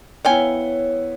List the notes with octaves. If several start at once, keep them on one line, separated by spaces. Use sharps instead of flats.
B3 E4 C#5 F5 G5 G#5